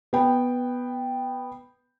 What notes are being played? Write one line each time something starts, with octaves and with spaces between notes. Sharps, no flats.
B3 G5